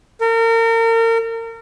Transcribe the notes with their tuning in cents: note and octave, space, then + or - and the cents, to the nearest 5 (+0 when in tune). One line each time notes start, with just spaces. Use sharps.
A#4 -35